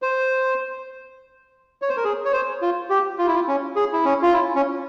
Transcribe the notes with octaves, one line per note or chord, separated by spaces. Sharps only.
C5
C#5
C5
A#4
G#4
C#5
C5
F4
G4
F4
E4
F4
C#4
G#4
E4
C#4
F4
E4
C#4